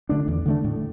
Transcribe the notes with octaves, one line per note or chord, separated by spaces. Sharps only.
D3 A3 D4
E2
D3 A3 D4
A2